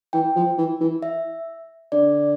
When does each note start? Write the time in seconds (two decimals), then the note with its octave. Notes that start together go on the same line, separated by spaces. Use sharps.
0.13 E3 G5
0.36 F3
0.58 E3
0.81 E3
1.02 E5
1.92 D3 D5